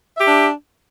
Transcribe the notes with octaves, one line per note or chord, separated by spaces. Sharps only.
D4 G4 E5